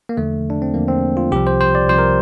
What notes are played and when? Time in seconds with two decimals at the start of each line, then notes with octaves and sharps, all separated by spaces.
0.09 A#3
0.17 E2 D3 F3 A3
0.50 D4
0.62 C4
0.74 E2 D3 F3 A#3
0.88 C4
1.17 F4
1.31 C2 C3 F3 G4
1.47 C5
1.61 C5
1.75 D5
1.88 C2 C3 F3 C5
1.98 A#4